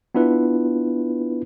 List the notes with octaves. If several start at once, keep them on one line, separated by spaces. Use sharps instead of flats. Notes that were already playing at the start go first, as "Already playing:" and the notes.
B3 D4 E4 F4 B4